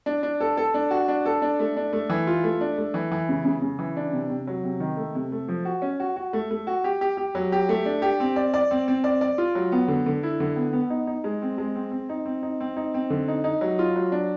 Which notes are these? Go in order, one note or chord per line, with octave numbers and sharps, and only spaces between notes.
D4
D4
A4
A4
D4
F#4
D4
A4
D4
A3
D4
A3
E3
F4
A3
D4
A3
E3
E3
C#3
C#3
C#3
E3
D4
C3
C3
F#3
C3
D#3
A3
C3
A3
F3
F#4
C#4
F#4
F#4
A3
A3
F#4
G4
G4
G4
F#3
G4
A3
D4
G4
C4
D5
D5
C4
C4
D5
D5
F4
F#3
B3
D3
D3
E4
D3
B3
B3
D#4
D#4
G#3
C4
G#3
C4
C4
D#4
C4
D#4
C4
D#4
C4
D3
D#4
D#4
F#3
F4
F#3
D4